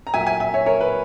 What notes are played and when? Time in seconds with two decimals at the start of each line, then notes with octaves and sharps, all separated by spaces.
0.07 A#5
0.14 A#2 F#3 E5 G#5
0.27 E5 G#5
0.40 E5 G#5
0.54 C#5 E5
0.66 A#4 C#5
0.81 B4